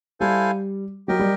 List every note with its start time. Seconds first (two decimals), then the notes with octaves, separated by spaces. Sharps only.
0.20 G3 E4 A4 C5 F5 G#5
1.08 F#3 G4 A#4 D#5 G5
1.19 G3